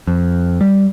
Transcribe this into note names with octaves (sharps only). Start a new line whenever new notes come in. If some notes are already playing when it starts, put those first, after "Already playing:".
F2
G3